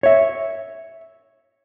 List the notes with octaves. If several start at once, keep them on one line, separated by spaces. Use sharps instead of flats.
C#5 E5